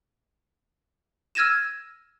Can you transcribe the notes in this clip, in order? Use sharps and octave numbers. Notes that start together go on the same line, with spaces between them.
E6 F6 G#6 A#6 D#7 E7